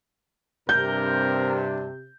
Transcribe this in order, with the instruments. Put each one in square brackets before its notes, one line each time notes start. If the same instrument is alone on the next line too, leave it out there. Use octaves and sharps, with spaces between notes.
[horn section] G2 D4 [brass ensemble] C3 [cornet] A#4 [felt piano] G6